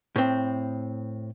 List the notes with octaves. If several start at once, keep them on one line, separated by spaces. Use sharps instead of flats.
A2 C4